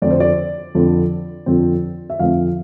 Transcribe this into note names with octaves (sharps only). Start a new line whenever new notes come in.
F2 D3 F3 C4 D5
C5
D5
F2 D3 F3 C4
F2 D3 F3 C4
E5
F2 D3 F3 C4 F5